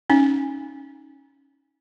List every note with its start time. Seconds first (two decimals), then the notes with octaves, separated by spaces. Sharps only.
0.10 C#4 D#4